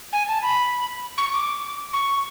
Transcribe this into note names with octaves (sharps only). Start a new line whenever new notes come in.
G#5
A5
B5
C#6
D6
C#6